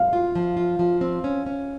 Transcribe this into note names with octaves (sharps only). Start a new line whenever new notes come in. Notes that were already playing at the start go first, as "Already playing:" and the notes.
Already playing: F5
F4
F3
F4
F3
C4
C#4
C#4